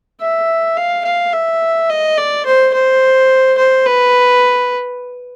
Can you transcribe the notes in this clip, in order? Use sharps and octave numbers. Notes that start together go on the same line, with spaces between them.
E5
F5
F5
E5
D#5
D5
C5
C5
C5
B4